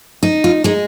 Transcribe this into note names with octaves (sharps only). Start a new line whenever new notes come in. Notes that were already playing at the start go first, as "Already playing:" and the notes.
D#4
F4
G#3 D#4